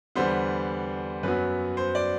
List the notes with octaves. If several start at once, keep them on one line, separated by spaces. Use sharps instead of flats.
E2 D3 G3 B3 C5
F#2 F#3 B3 B4
C5
D5